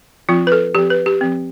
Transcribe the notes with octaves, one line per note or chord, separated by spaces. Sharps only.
F3 C4 F4
B4
A4
F3 C4 G4
B4
G4
F3 C4